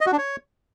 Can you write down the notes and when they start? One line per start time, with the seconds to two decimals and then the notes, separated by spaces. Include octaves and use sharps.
0.01 D#5
0.06 F#4
0.12 D4
0.18 C#5